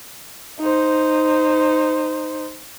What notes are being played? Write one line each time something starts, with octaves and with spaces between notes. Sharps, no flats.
D#4 C5